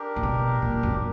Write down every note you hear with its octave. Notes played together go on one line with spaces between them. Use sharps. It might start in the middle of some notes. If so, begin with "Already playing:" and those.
Already playing: D4 G4 A#4
A#2
B2
A#2
F#2